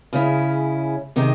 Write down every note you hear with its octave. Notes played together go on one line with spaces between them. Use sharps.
C#3 G#3 C#4 E4
C3 D#3 G#3 D#4